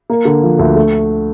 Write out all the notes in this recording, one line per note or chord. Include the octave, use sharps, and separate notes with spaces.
A#3
D3
F3
D2
A3